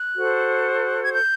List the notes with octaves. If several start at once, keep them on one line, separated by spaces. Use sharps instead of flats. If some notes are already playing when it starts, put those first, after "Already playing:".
Already playing: F#6
F#4 A4 C5
G#6
G6